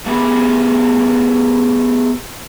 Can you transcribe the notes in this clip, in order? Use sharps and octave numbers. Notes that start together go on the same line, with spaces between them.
A3 B3 G4 G#4 B4